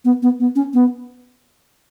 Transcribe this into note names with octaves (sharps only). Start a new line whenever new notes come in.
B3
B3
B3
C#4
B3